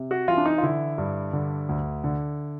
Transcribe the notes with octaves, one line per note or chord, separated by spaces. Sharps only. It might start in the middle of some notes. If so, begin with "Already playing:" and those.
Already playing: C3
F#4
E3 F4
D4
D#4
F4
D3 E4
G2
D3
D2
D3